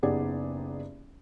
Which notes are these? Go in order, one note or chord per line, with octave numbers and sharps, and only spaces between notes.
F#1 B3 D#4 G4 G#4 D5